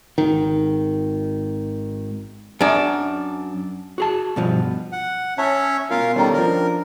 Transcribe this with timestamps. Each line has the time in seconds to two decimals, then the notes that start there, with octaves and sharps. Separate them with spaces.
0.18 G#1 D#3
2.61 F#2 D4
3.98 F#4 G#4 A5
4.36 G2 B2 F3
4.92 F#5
5.38 C#4 C#5 E5 A5
5.91 B2 F4 A#4 F5
6.16 D#3 G3 C#4 A4 A#5
6.33 F3 D4 A#4